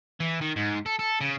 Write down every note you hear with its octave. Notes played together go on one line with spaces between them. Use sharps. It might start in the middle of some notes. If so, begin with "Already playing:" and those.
E3
D#3
G#2
A4
A4
C#3